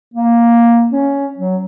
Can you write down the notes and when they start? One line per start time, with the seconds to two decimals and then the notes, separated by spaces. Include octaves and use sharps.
0.14 A#3
0.92 C#4
1.38 F#3